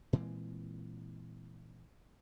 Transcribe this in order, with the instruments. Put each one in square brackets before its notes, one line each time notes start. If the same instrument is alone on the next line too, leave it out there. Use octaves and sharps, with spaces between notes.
[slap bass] A#2 E3 G#3 C4